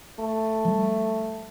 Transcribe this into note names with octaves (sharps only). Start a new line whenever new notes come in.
A3
F3 G3